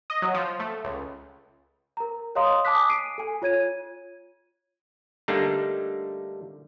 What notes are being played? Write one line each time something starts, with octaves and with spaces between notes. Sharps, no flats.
D#5
F#3
F3
A3
C#2
A#4 A#5
C#5 D#5 F5 A#5 C6 D#6
G#5 A5 D6 D#6 F#6 B6
C7 D7 D#7
A4 G#5
F4 C#5 G#6 D#7
D3 G3 A3 A#3 D4 D#4